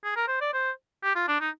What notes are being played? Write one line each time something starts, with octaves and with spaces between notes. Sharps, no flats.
G#4
A#4
C5
D5
C5
G4
F4
D4
D#4